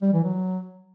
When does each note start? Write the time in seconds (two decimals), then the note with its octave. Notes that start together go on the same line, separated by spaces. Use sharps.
0.02 G3
0.13 E3
0.24 F#3